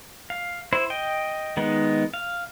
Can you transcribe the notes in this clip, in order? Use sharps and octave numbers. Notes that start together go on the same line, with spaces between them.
F5
E4 C5
D#5 G5
D#3 G#3 B3 D#4
F5